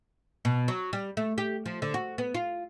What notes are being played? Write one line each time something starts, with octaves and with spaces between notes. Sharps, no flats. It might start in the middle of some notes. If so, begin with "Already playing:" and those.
B2
F#3
G3
A3
G4
F3
D3
F#4
B3
F4